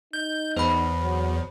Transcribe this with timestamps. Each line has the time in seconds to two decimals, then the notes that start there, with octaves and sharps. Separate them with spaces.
0.13 D#4 G6
0.57 E2 C5 B5
1.02 F#3